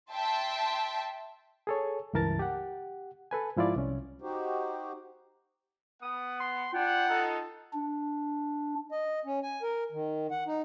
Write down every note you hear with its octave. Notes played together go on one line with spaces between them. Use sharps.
E5 G5 A5 C6
G#4 A4 C#5
C#2 G2 E3 A#4 A5 A6
G4 F#5
A4 B4 G#5
G#2 F3 E4 F4 D5 F5
C2 C#4
D#4 F#4 G4 C5
B3 F#5 D#6
C6
G3 D4 F4 F#5 G5
D#4 A4
D4
D#5
C#4
G#5
A#4
D#3
F#5
D#4